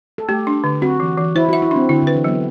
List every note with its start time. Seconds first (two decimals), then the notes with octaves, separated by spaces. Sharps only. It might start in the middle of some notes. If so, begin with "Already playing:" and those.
0.18 A4
0.29 A3 G4
0.47 D4
0.64 D3
0.82 C4 F#4
1.00 E3
1.18 E3
1.36 E4 C5
1.49 F#4
1.53 E5
1.62 E4
1.71 C4 D4
1.89 D3 E4
2.02 D3
2.07 B4
2.15 E3
2.24 F#3 B3